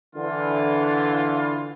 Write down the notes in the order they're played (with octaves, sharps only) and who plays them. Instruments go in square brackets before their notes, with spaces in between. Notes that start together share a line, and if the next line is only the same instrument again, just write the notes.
[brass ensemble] D3 E3 F4